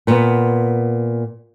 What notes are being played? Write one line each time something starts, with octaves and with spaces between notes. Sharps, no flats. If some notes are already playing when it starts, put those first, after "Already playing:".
A#2 B3